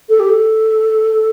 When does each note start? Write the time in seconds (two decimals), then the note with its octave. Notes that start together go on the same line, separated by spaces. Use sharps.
0.09 A4
0.20 G4
0.29 A4